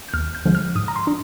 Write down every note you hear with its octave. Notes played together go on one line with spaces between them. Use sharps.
G6
D#2 F6
G6
D3 F3 G#3
F6
G#2 D#6
A#5
C6
D4